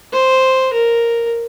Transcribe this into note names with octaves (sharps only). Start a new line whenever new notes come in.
C5
A#4